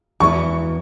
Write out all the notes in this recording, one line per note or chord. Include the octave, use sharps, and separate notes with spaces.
E2 E3 B3 E4 C#6